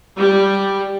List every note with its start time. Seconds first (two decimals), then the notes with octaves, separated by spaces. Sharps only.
0.18 G3